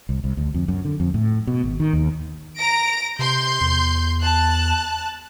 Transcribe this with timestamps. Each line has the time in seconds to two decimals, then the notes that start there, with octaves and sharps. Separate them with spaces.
0.09 C2
0.24 C2
0.37 D2
0.54 F2
0.68 F#2
0.85 D3
1.00 F2
1.14 A2
1.47 B2
1.64 G#1
1.80 D#3
1.93 D#2
2.59 A#5 A#6 D7
3.19 C3 C6 G6
3.61 E2
4.22 A5 F#6